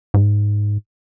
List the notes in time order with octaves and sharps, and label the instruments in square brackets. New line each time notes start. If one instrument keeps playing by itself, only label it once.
[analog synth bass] G#2